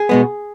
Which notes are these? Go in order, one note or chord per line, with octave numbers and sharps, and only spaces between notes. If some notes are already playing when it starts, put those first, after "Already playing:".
Already playing: G#4
B2 G#3 B3